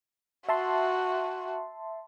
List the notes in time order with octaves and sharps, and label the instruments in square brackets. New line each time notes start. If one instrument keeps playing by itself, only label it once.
[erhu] F#4 [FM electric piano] E5 A5 C6